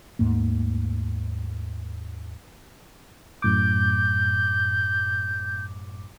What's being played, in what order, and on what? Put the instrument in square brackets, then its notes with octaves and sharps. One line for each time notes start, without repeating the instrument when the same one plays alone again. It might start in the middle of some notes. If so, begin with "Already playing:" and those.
[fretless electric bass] D#2 G#2 A3 A#3
[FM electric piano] F#2 A2 D6 [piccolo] G6